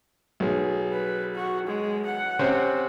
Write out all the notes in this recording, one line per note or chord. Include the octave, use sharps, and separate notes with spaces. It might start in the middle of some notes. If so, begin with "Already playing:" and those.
B1 G#4
B4
F#4
G#3
F#5
C3 C4 C#4